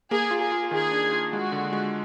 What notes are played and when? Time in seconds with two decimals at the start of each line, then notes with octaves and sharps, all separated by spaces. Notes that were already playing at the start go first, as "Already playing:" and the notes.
0.11 A#3 G#4
0.31 F4
0.41 G#4
0.52 F4
0.71 D#3 G#4
0.91 D4
1.13 F4
1.32 G#3 F#4
1.52 D3
1.73 G#3